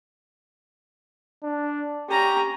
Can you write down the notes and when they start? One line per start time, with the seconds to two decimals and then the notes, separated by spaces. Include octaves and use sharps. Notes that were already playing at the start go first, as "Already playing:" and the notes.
1.43 D4
2.09 C#4 G4 A#5